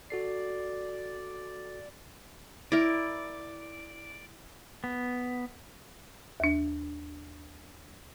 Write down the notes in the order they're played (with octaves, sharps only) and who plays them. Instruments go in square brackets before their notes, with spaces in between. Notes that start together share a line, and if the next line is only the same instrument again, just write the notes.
[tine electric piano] F#4 A4 C7 [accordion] D5
[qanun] E4 A#4 [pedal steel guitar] D5
[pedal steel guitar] B3
[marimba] D#2 D4